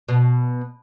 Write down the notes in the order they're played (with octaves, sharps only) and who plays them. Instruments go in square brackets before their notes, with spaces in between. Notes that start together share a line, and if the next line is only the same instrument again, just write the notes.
[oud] B2